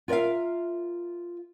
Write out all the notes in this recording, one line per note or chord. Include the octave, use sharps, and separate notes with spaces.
F4 A#4 D5 E5 F5